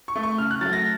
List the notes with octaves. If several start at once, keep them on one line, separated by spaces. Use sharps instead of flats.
C#6
A3
C#6
C#3 F6
F#6
F#3 A3 A6
A#6